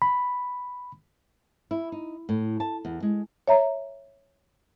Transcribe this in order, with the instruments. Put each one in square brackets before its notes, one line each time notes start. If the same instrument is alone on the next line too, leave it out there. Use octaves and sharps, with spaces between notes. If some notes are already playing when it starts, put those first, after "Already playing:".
[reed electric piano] B5
[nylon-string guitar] E4
D#4
A2
A5
E2
G#3
[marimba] C#5 E5 A#5